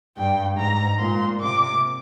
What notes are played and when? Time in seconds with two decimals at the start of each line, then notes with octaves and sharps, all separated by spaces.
0.17 G2 G5
0.58 G#2 A#5
0.99 A#2 C6
1.40 C3 D6